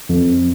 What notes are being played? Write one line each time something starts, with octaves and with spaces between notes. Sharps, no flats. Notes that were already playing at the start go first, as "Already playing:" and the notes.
F2